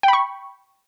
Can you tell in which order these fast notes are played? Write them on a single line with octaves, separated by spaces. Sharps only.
G5 B5 C#6